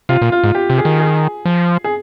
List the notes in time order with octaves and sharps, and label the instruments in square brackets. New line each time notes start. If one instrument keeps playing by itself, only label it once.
[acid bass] C3 [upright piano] F4
[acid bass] A#2
[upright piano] F4
[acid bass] G#2
[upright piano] G4
[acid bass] C3
[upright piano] G#4
[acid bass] D#3
[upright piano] G#4
[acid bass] F3
[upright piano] G#4